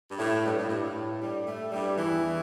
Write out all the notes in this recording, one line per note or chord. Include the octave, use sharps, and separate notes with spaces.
G2
A2
G2
A2
G2
A2
G2 G3
A2 A3
G2 G3
E2 E3